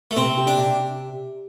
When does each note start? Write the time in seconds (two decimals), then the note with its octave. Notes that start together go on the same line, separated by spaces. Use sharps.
0.11 A3
0.17 C3 C4
0.37 G4
0.47 D4
0.57 C3